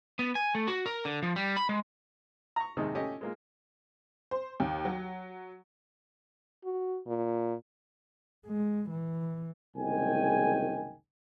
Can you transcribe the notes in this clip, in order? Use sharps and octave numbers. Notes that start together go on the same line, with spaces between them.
B3
G#5
A3
F#4
A#4
D3
F3
G3
B5
G#3
A#5 C#6
D#2 C3 D#3 G#3 D#4
A3 C#4 G4 D#5
G#3 A#3 F4
C5
D#2
F#3
F#4
A#2
G#3
E3
F#1 C2 D#3 G#3 G5 G#5